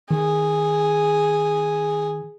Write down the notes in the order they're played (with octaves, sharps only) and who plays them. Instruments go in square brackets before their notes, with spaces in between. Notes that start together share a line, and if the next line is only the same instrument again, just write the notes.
[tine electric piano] D#3 [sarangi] G#4